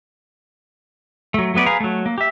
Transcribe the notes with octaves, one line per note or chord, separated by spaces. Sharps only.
F#3 A3
F#3 A3 B3 B4 D5
G#4 B4 F5 A#5
F#3 A3
A#3
G4 E5